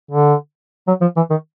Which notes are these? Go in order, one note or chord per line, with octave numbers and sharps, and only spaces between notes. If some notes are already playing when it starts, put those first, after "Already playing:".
D3
F#3
F3
E3
D#3